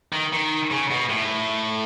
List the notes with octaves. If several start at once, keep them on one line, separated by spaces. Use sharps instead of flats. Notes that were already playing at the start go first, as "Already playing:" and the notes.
D#3
D#3
C#3
B2
A2